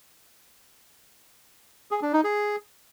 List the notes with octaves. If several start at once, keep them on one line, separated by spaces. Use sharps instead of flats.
G#4
D4
D#4
G#4